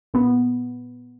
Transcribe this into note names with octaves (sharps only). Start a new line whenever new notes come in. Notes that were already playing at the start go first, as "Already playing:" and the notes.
A#2 B3